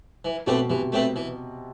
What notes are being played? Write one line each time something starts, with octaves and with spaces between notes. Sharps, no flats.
E3
B2 A3 C4 G4 B4
C3 E3
A3 C4 G4 B4
E3